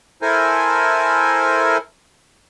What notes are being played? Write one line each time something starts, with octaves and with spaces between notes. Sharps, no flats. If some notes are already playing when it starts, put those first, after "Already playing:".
E4 A4 A#4 C5 G#5